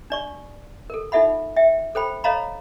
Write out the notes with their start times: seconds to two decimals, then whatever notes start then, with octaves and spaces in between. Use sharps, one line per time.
0.10 D4 D5 C#6
0.90 A4 A#4
1.12 D#4 F4 A4 E5 F#5 B5
1.56 E5 G5
1.95 A4 C5 G5 B5
2.24 A4 C#5 D#5 F5 A#5 B5